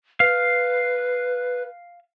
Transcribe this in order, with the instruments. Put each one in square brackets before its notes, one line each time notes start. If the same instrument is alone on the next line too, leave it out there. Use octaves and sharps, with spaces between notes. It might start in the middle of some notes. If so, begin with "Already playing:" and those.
[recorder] B4 [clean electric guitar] F5